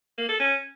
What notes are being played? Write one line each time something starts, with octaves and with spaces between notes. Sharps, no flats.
A#3
A4
C#4